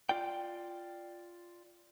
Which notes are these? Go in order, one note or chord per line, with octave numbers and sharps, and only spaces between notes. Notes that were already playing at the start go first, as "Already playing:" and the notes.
F4 D5 G5